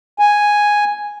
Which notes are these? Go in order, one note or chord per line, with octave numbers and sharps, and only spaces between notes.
G#5